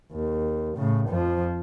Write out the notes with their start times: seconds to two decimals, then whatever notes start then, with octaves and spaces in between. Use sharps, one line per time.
0.12 D#2
0.77 A2 C#3
1.09 F2 F3